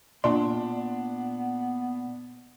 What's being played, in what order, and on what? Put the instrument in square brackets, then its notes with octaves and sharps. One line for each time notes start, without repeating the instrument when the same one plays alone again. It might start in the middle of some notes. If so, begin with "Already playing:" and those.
[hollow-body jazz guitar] A#2 C6 [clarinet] B3 [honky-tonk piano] D4